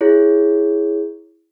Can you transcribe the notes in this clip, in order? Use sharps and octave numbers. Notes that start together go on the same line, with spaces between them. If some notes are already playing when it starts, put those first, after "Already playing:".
E4 G#4 C#5